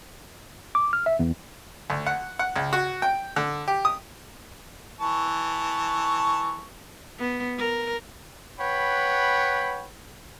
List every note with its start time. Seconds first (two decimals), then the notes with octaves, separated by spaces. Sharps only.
0.75 D6
0.93 F6
1.06 E5
1.19 E2
1.90 D2
2.06 F#5
2.39 F#5
2.56 C#2
2.73 F#4
3.02 G5
3.36 D3
3.68 G4
3.85 D#6
5.00 E3 A5 C#6
7.19 B3
7.58 A#4
8.59 B4 C#5 F#5 G5 B5